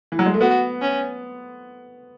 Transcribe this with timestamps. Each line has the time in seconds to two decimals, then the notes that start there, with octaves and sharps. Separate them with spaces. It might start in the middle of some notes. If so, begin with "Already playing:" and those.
0.12 E3
0.19 F#3
0.26 G#3
0.34 A3
0.41 B3 F#4
0.82 C#4